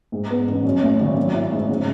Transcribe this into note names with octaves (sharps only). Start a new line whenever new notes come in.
G#2
B3
A1
F#2
A3
G#1
F#3
E4
G#2
C#3